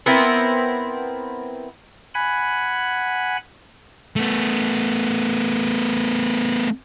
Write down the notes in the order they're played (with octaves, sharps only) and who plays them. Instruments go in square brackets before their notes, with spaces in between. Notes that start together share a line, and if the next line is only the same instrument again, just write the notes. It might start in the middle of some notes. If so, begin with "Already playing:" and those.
[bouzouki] B3 C4 E4 A#4
[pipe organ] F#5 G#5 B5
[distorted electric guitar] A3 B3